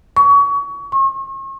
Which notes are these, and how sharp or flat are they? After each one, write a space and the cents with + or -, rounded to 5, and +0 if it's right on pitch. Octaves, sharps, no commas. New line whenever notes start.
C#6 +30
C#6 -40